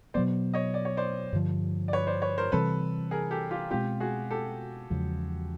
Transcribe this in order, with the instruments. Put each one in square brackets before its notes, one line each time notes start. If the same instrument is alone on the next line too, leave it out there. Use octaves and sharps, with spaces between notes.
[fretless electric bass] B2 F#3 B3 [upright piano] C5 D5
[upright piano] C#5 D#5
D5
C#5
C5 D5
[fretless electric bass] G2 D3 F3
[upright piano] D5
B4 C#5
C5 D5
B4 C#5
A#4 C5
[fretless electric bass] C3 E3 G3 C4 [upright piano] A4 B4
[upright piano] G#4 A#4
G4 A4
F4 G4
[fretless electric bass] B2 G#3 C4 [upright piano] F4 G4
[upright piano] F#4 G#4
G4 A4
[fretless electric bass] E2 C#3 F3 G#3